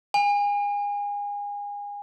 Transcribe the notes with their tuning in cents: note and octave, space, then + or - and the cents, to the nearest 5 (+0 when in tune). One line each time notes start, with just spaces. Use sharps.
G#5 -30